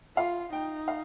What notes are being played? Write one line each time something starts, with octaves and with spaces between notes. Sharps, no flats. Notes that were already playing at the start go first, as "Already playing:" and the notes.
F4 F5
D#4 G5
F5